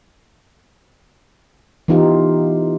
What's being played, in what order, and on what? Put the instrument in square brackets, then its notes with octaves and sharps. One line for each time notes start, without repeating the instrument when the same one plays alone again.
[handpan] E3 B3 D#4 F4 G4